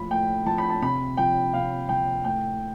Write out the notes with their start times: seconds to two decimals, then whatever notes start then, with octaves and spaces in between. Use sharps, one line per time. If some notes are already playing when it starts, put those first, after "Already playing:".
Already playing: A2 F3 B5
0.10 A2 G5
0.46 F3 A5
0.58 B5
0.70 A5
0.82 C3 B5
1.17 F3 G5
1.53 C3 F5
1.89 F3 G5
2.24 A2 G5